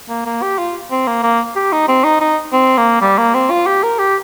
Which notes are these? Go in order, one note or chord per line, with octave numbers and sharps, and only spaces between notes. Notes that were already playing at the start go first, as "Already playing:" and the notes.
A#3
A#3
G4
F4
C4
A#3
A#3
G4
D#4
C4
D#4
D#4
C4
A#3
G3
A#3
C4
F4
G4
A#4
G4